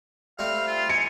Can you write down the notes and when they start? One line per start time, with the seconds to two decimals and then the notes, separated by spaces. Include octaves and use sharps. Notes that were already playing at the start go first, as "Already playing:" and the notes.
0.39 G3 A3 C4 F5
0.67 F4
0.89 G#5 C#7